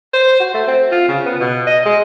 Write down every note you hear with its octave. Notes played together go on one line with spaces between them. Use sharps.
C5
F#4
A3
C4
F4
C#3
B3
B2
D#5
G#3